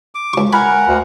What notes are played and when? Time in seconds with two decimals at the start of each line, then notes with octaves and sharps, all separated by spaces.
0.15 D6
0.33 C#2 C#6
0.53 A#4 F5 F#5 G#5 B5
0.88 D2